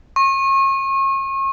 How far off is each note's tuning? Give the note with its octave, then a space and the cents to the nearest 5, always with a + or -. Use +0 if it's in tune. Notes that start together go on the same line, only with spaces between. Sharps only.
C#6 -35